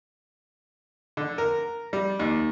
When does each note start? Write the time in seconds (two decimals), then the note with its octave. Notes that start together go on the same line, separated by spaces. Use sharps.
1.17 D3
1.38 A#4
1.93 G3
2.19 D#2